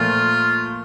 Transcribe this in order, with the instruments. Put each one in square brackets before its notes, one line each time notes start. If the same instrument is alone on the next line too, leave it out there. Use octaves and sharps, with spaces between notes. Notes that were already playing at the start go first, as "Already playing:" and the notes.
Already playing: [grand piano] A#2 F3 A3 [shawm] F4